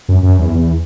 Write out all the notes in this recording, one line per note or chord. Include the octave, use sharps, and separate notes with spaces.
F#2
F#2
E2
E2